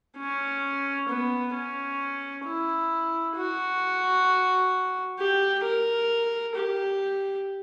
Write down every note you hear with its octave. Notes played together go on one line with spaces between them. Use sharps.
C#4
B3
C#4
E4
F#4
G4
A#4
G4